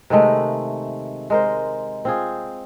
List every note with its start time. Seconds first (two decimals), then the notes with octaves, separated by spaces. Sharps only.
0.10 C3 D#3 G#3 A3
1.30 G#3 A#4 C5
2.05 C4 F4 G#4